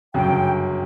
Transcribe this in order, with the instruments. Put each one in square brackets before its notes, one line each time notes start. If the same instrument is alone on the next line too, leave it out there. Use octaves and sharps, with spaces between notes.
[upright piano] G1 F#2 C#3 F#3 [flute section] G5